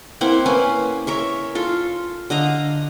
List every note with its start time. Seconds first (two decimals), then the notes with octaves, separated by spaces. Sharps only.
0.21 A#3 C4 E4 F#5
0.46 A#3 C#4 B4
1.07 A#4 C#5 E5
1.55 F4 A4
2.30 D3 D#5 F5 A#5